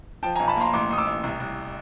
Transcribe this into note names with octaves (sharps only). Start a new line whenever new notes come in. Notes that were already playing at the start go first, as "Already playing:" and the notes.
F3 G5 A5
G#5 A#5
B1
A5 B5
A#3 A#5 C6
A1 C6 D6
A1 D#6
D6 E6
A1
C2
C2